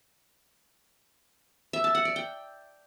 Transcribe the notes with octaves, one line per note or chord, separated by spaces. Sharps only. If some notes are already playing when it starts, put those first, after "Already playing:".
E5
A5
F#5
D5
G5